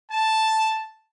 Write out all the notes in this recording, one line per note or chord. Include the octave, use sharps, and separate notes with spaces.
A5